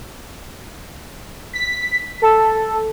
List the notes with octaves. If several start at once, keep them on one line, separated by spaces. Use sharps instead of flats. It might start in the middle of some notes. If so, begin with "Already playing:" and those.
B6
A4